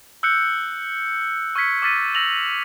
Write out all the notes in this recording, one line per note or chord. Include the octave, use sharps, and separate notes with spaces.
E6 F#6 G6 C#7
C#6 F6 G#6 B6 C#7
D6 E6 F6 A6 B6 D#7
E6 A#6 F7 F#7